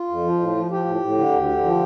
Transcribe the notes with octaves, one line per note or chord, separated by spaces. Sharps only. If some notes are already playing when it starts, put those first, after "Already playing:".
Already playing: F4
F2
F3
A2
F3
F3 G4
A2
A2
D3
D2
D3
F3